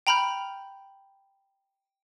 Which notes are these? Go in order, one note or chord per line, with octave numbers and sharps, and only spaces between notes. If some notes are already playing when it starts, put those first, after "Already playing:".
G5 A#5 B5 F6 G6